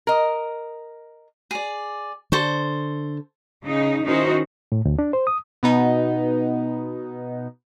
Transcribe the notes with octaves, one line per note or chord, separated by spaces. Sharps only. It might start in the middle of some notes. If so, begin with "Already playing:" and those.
A#4 D#5
G#4 D5
D3 A4 C5 C#6
C#3 D#4
D#3 C#4 D#4 E4 F#4 C5
A2
D2
D4
C5
D#6
B2 B3 D#4